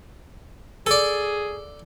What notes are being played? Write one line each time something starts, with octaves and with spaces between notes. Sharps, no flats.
G#4 A4 D5